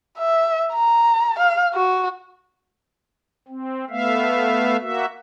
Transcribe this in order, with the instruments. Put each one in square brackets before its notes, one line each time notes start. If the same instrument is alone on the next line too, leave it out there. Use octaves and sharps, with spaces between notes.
[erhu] E5
A#5
F5
F#4
[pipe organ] C4
A3 B3 E5 F5
A#3 F#4 E5